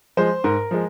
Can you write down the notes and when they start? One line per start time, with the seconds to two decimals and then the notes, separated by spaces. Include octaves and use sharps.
0.17 F3 G#3 C5
0.44 G#2 A#4
0.71 F3 G#3